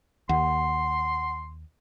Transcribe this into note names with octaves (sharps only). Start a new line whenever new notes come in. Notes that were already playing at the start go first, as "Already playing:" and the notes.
D#2 F#5 C6